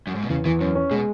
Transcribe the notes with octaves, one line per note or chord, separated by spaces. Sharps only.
F#2
G#2
B2
E2 C#3
E2 E3
F#2 C#4
C#4
B2 G#3